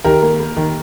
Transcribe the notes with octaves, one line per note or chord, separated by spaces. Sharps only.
D#3 G4 A#4
A#3
A#3
D#3